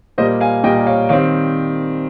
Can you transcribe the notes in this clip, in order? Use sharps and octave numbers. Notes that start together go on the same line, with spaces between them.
A#2 G3 A#3 C5 D#5
F5 G#5
A#2 G3 A#3 D#5 G5
C#5 F5
D#3 G3 C4 C#5 F5